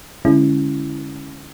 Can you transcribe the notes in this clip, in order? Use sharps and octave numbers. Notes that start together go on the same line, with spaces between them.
D3 G#3 C#4 E4